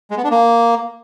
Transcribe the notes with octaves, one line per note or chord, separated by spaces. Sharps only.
G#3
B3
D4
A#3